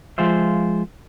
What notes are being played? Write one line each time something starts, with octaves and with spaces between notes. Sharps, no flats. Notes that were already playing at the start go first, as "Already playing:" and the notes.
F3 G#3 F4 C5 E5